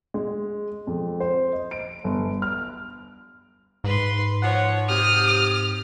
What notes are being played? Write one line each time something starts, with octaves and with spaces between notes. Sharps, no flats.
G#3
F2
C5
D#5
D7
G1
F6
G#2 B4 C6
F3 C#5 F#5
C3 G4 D#6 F6